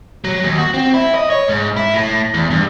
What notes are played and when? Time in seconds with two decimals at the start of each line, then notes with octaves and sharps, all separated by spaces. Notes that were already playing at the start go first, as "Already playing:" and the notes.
0.24 F#3
0.43 D#2
0.58 F#4
0.74 C4
0.94 E4
1.15 D#5
1.30 C#5
1.48 G#2
1.77 E4
1.94 A2
2.34 E2
2.50 G2